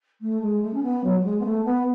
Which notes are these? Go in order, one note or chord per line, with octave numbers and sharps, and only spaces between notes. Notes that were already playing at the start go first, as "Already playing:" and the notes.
A3
G#3
A3
C#4
B3
F#3
F#3
G#3
B3
A3
B3